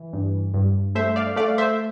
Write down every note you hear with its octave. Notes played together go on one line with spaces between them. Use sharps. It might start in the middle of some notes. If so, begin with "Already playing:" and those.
Already playing: E3
G2
G2
A3 C5 E5
D5 F5
A3 D5 F5
C5 E5